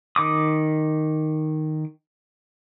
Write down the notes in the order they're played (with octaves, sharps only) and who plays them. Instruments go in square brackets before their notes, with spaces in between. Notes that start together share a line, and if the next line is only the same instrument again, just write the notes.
[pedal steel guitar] D#3 D6 D#6